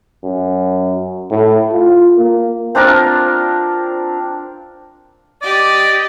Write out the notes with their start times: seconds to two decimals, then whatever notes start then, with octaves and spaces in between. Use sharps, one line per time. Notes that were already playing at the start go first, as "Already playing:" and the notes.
0.24 F#2
1.31 A2
1.72 F4
2.18 A#3
2.75 C4 D4 F4 A#4
5.42 G4 D5 D#5